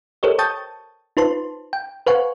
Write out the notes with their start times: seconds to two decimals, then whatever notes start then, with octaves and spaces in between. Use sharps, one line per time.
0.23 G4 A4 A#4 C5 C#5 D#5
0.39 G5 A5 C#6 D#6 G6 A6
1.17 D#4 F4 B4 C5 A5 C6
1.73 G5
2.07 B4 C5 F5 F#5 G#5 C#6